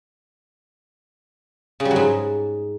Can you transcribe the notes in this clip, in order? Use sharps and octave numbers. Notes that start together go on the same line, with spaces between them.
C#3
G3
F#3
G#2